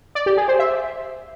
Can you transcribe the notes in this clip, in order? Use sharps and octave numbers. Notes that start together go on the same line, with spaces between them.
D5
G4
G#4
C5
E5